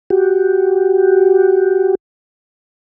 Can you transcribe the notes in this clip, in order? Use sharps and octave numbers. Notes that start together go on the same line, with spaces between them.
F#4 G4